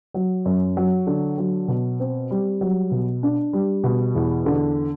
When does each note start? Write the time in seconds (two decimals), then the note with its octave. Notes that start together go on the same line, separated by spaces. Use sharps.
0.14 F#3
0.45 F#2
0.77 F#3
1.07 D3
1.38 F#3
1.68 B2
2.00 C4
2.31 G3
2.61 F#3
2.91 B2
3.23 D4
3.53 G3
3.84 B2
4.15 E2
4.46 D3